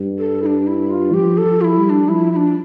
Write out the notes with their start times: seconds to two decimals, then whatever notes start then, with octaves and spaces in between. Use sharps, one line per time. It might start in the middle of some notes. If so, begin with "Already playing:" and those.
Already playing: G2
0.19 A4
0.43 E4
0.46 D4
0.67 E4
0.90 F4
1.13 F3 G4
1.38 A4
1.45 F3
1.61 F4
1.64 E4
1.78 G3
1.85 E4
1.90 D4
2.08 F3 E4
2.32 E4
2.36 D4